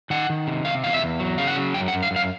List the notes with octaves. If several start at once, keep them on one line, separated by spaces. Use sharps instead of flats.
D#3 F#5
D#3
C3
C3 F5
E2 F5
E5
E2
F#3
C#3 F5
F#5
F#3
F#2 G5
F#5
F#2
F5
F#2
F5